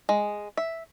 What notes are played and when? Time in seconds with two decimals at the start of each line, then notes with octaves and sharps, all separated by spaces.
0.09 G#3
0.57 E5